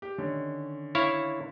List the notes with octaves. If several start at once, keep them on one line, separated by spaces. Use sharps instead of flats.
G4
D3 D#3 C#4
E4 C#5 F5